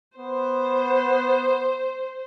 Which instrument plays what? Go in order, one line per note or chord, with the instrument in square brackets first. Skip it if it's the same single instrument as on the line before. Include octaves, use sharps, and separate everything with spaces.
[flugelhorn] B3 [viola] C5